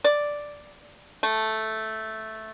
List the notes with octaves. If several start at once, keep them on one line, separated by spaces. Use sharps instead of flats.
D5
A3